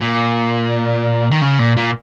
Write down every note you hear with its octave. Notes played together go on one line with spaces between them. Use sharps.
A#2
D#3
C#3
A#2
A#2